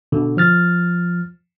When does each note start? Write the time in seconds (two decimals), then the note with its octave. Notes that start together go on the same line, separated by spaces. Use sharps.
0.12 B2 D3
0.37 F3 F6 A6